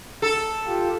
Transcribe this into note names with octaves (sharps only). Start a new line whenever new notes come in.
A4
F4 G4